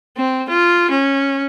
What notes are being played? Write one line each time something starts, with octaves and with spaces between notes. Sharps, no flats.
C4
F4
C#4